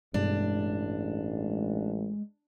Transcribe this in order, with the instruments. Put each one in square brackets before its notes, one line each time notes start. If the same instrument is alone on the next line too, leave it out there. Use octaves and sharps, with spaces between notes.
[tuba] A1 [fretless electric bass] G2 B2 [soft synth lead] G#3 [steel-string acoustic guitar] D4